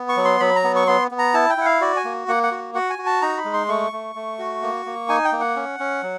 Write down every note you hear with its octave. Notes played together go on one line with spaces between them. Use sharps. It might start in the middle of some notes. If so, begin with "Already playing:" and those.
Already playing: B3
C#6
F#3
C6
F#3 B5
A#5
B3
C#6
B3 C6
B3
A#5
E4 A5
G5
E4 F#5
F5
F#4 D5
G#5
A#3
A#3 F#5
F#5
F#4
F#4 F#5
G#5
F#4
A5
D#4 A#5
B5
G#3
C6
A3 C#6
A3
A3
F#4
A#3
A#3
D#4 G#5
G5
A#3
F#5
C#4
C#4
F#3